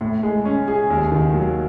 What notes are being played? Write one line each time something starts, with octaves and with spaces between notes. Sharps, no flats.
A2
G#3
C#4
G#4
D#2
D#3
F#3